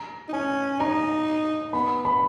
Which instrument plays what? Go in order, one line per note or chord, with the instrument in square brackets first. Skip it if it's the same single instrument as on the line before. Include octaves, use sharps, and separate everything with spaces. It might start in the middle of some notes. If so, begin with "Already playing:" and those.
Already playing: [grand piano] A#5
[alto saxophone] D#4
[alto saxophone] C#4 [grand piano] G#5
[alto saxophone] D#4 [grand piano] A#5
[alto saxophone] B3 [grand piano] B5
[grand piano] B5